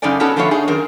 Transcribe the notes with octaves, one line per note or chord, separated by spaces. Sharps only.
F#2 C#3 D#4 A4 D5 G#5
B3 C#4 D#4 F#4 A4
D3 F3 A3 B3 F4 C#5
D#4 G#4
F#2 D#3 A#4